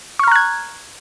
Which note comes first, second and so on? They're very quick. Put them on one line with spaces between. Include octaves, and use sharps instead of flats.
C#6 F6 A#5 F#6 G#6